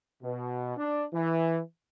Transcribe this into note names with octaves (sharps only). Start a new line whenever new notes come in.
B2
D4
E3